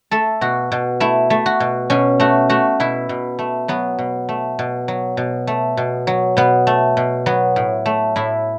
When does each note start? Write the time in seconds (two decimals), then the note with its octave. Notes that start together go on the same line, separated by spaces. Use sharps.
0.11 A3 A4
0.41 B2 F#4
0.72 B2
1.00 A3 E4
1.30 A3
1.46 F#4
1.60 B2
1.90 B2 C#4
2.20 A3 F#4
2.49 A3 F#4
2.80 B2 E4
3.09 B2
3.39 A3
3.68 F#3 B3
3.99 B2
4.29 A3
4.59 B2
4.88 F#3
5.17 B2
5.47 A3
5.77 B2
6.07 F#3
6.37 B2 B3
6.67 A3
6.97 B2
7.26 F#3 B3
7.56 A2
7.86 A3
8.16 A2 E4